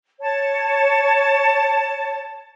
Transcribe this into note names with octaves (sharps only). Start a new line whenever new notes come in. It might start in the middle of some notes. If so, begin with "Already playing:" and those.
C#5 A5